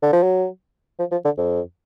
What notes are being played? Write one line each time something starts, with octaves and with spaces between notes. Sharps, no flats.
D3
F3
F#3
F3
F3
D3
F2